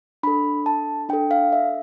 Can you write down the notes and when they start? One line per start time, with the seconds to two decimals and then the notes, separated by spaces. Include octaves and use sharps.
0.23 D4 A4 B5
0.66 A5
1.09 D4 G5
1.13 A4
1.31 F5
1.53 E5